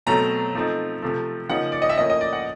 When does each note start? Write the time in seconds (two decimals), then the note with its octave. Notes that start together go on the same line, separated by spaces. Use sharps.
0.06 B2 F#3 A3 C4 A#5
0.54 F3 A3 C4 D#4
1.02 C3 F3 A3
1.49 C#3 F3 A#3 D#4 F#5
1.72 D5
1.82 D#5
1.89 E5
1.98 A2 F3 A#3 C#4 D#5
2.10 D#5
2.21 D5
2.33 F#5